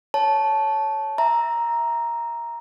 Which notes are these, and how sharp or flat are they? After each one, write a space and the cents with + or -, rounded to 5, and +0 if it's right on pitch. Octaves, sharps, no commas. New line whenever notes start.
C#5 +0 A5 -10
E5 +0 A#5 +5